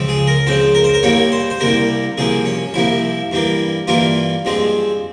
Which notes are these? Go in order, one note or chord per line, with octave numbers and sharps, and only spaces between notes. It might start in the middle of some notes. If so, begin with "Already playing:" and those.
Already playing: C#2 C#3 F3 C4
G#4
A#4
C#2 C#3 F3 C4 C5
A#4
C5
A#4
C2 C3 G3 A#3 C#5
C5
C5
C2 C3 G3 A#3 A#4
C2 C3 F3 A#3 G#4
C#4
C2 C3 F3 A#3 E4
G2 E3 G3 A#3
G2 E3 G3 A#3 F4
G2 F3 G#3 C4